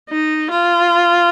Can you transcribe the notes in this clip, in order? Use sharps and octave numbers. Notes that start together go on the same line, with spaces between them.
D#4
F4